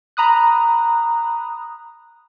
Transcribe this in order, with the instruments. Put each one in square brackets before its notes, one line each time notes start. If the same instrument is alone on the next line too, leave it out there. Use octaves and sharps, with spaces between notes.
[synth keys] A#5 B5 D#6 F#6